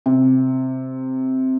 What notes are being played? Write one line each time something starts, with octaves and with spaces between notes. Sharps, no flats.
C3